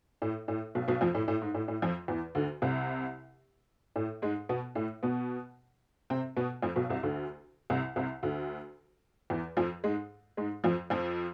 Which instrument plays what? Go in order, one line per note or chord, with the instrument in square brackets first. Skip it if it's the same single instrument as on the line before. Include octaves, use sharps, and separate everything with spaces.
[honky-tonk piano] A2
A2
B1 B2
B1 B2
F2 F3
A2
A2
G#2
A2
A2
F2 F3
E2 E3
D2 D3
C2 C3
A2
G#2 G#3
B2 B3
A2 A3
B2 B3
C3 C4
B2 B3
F2 F3
B1 B2
C2 C3
D2 D3
C2 C3
C2 C3
D2 D3
E2 E3
F2 F3
G#2 G#3
G#2 G#3
F2 F3
F2 F3